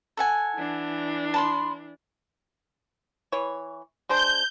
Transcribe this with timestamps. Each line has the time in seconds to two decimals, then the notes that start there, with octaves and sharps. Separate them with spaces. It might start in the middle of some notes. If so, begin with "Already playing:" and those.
0.17 A4 F#5 G#5
0.56 E3 D4
1.34 A5 B5 C6
3.32 E3 C#5
4.09 G#3 D4 C5 G6